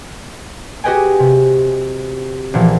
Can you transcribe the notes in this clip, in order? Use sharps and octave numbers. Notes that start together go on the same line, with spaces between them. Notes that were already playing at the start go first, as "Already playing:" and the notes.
F#4 G4 B4 D#5 G5 G#5
C3
A#1 A#2 E3 F3